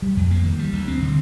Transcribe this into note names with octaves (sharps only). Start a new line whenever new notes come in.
G3
F2
A#3
D#3
G3
D2
C4
D3